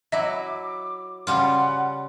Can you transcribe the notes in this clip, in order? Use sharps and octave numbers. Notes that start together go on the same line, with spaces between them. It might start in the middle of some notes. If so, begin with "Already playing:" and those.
F#3 E4 D#5 E5 D6
C#3 G3 F4 F#5